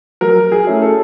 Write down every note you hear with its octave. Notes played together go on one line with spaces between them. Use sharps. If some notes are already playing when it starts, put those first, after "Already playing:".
F#3 A#4
G#4
A3 C#4 E4
A4